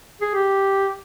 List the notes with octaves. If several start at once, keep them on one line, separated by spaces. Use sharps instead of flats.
G#4
G4